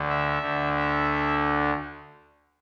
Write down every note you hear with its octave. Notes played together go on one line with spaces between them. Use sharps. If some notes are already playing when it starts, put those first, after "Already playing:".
Already playing: D2 D3
E5
D2 D3
E5